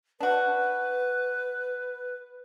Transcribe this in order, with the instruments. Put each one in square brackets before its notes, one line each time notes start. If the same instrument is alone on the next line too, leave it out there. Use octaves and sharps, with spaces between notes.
[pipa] D4 F#4 [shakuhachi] B4